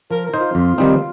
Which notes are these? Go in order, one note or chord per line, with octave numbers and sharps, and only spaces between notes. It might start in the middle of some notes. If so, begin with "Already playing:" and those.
F3 A#4
A#4
D#4 C5
F4
F2
D#3 G3 C4 D#4